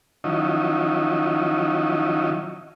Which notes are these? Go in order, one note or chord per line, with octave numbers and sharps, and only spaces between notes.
D#3 F3 F#3 C#4 D#4 E4